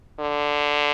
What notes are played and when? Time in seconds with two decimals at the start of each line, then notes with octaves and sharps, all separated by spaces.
0.20 D3